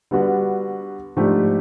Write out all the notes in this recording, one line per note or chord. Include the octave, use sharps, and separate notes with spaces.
D3 G3 B3 D4 F#4
G#2 F3 A3 D4 G4